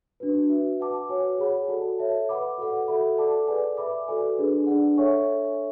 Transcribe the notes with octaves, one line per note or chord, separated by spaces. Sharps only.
D4 F#4 B4
F#4 B4 E5
B4 F#5 A5 D6
F#4 C#5 G#5
G#4 C#5 F#5 B5
F#4 A4 D5 A5
A4 C#5 E5 A5
B4 F#5 B5 D6
F#4 A4 D5 F#5
F#4 A4 E5 B5
A4 D5 F#5 A5 D6
G#4 B4 D5 G#5
B4 E5 B5 D6
F#4 A4 D5 G#5
D4 G#4 B4
D4 G#4 D5 F#5
A4 C#5 E5 G#5 C#6